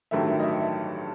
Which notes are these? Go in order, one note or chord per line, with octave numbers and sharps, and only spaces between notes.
A1 G2 D#3 F#3 A3 E5
D#5
E5